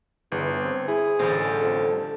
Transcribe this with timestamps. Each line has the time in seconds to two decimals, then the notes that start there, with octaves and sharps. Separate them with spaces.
0.32 G1 E2
0.64 C4
0.88 E4 G#4
1.19 A1 D3 G3 C5
1.61 F2